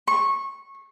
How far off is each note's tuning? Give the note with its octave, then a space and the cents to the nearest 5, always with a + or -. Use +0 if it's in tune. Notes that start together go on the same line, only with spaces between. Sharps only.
C#6 -20